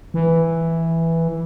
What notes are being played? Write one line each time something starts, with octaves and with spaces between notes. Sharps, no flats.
E3